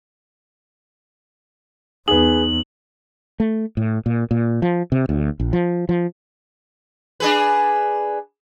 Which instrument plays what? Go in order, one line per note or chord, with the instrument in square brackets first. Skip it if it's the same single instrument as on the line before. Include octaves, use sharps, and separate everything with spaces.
[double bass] E2 [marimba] D#4 [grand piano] G#4 B4 [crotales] F#7
[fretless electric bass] A3
A2
A#2
A#2
F3
C3
D2
A#1
F3
F3
[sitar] D4 G#4 B4